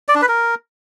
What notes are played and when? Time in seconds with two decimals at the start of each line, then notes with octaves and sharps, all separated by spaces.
0.08 D5
0.15 D4
0.22 B4
0.29 A#4